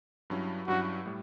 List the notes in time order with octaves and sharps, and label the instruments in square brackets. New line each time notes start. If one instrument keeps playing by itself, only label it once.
[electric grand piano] G2 F#3 C#4 E4
[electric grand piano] G2 F#3 C#4 E4 [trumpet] F#4
[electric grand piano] A2 G3